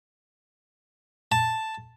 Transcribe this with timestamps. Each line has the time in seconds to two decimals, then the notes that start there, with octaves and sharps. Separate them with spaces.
1.32 A5